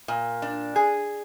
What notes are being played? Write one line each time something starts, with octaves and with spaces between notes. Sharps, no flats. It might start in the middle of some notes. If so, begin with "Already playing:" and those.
A#2
D4
G#4